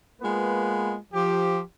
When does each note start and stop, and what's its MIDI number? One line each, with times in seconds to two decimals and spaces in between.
0.21 0.95 56
0.21 0.95 58
0.21 0.95 59
0.21 0.95 65
0.21 0.95 71
1.13 1.59 53
1.13 1.59 67